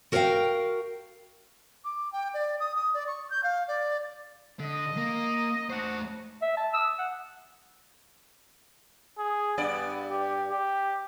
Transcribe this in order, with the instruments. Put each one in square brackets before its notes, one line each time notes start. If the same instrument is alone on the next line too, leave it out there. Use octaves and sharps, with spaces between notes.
[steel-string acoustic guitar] F#4 A#4 C#5 E5 F5 G5
[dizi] D6
G5
D5
D#6
D#6
D5
C#6
G6
F5
D5
[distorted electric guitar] D3 [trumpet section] D#5
[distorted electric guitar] A#3
[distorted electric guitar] A3 C5 [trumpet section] D4 F#4
[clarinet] E5
A5
E6
F#5
[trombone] G#4
[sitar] G2 D5 [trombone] B3
[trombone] G4
G4